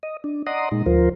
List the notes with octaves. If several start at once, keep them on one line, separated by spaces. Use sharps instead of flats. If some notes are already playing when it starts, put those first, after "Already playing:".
D#5
D4
D5 D#5 F#5 A#5 C6 D#6
A#2 G#3 D#4
D2 F3 F4 A#4 C5